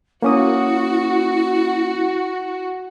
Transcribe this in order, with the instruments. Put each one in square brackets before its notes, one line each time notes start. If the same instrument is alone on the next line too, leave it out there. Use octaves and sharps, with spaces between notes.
[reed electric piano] A#3 C#4 D#6 [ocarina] E4 [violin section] F#4